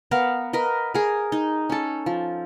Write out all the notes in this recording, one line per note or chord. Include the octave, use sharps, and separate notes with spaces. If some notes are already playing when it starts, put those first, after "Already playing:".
B3 A#4 F5
A#4 B4 D#5
G#4 A#4
D#4
C#4 A4
F3